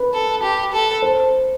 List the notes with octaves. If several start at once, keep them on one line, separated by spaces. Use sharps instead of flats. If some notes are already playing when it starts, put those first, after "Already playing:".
Already playing: B4
A4
G4
A4
C5